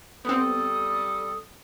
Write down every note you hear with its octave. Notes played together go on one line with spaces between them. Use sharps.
G3 B3 C4 A4 D#6